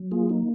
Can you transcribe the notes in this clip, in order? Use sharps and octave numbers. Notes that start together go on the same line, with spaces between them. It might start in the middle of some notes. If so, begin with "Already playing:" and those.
Already playing: F#3
A#3 F4 G#4
D#4